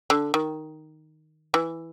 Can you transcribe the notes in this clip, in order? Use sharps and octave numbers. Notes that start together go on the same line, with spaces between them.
D3
D#3
E3